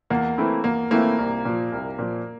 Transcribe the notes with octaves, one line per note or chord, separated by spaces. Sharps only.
E2 A#3
E3 A3 C4 E4
E2 A#3
E3 A3 A#3 C4 E4
C2
A#2 F3
C2
A#2 F3